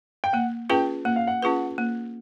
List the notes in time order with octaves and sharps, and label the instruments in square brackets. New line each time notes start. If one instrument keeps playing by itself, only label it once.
[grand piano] G5
[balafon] A#3 [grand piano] F#5
[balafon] C#4 F4 G#4 B4 [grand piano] G5
[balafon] A#3 [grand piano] F#5
[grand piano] F5
F#5
[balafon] C#4 F4 G#4 B4
A#3